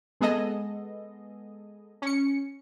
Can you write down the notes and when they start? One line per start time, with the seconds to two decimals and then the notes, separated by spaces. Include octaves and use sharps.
0.21 G#3 B3 G#4 A4 D#5
2.02 C#4 C#7